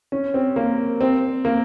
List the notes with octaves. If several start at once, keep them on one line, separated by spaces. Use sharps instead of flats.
C#4
C4
A#3
C4
A#3